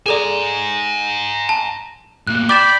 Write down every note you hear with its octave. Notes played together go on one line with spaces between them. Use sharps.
G#4 A4 D5 G#5 A#5
A5
A2 A#3 F#6
D5 G5 B5 D6 A6 E7